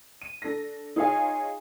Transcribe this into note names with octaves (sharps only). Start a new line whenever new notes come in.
D#7
D4 A4 A#6
D#4 F4 G#4 C#5 F5 G#5